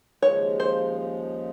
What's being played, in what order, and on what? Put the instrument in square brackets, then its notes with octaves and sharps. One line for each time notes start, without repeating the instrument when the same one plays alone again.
[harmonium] D#2 C#3 F3 G#3 [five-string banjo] C#5
[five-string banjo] C5